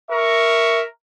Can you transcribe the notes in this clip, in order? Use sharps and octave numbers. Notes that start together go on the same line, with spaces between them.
A#4 E5 C#6